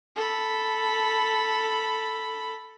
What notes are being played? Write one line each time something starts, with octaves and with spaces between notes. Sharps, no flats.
A4 B5